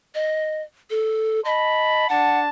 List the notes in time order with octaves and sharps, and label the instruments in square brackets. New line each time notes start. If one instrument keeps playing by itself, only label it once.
[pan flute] D#5
A4
[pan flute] D#5 [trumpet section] A5 B5
[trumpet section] D4 A5 [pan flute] F#5